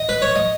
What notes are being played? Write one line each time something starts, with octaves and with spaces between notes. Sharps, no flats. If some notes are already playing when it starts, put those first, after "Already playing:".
Already playing: D#5
B4
C#5
D#5